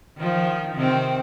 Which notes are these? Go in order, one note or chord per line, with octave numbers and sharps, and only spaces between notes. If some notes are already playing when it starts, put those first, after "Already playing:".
D#3 F3
C3 D#3 C4